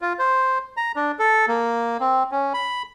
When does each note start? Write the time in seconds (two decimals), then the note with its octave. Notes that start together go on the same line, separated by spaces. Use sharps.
0.02 F4
0.19 C5
0.77 A#5
0.96 D4
1.19 A4
1.48 A#3
2.00 C4
2.31 C#4
2.54 B5